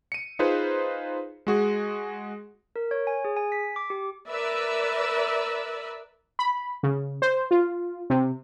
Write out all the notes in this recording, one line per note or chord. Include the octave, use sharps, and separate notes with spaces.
C#7 D#7
D#4 F4 G#4 B4 C5
G#3 F#4 G#4
A#4
C#5
G#5
G#4
G#5
B6
D6
G4
A#4 B4 D5 E5
B5
C#3
C5
F4
C3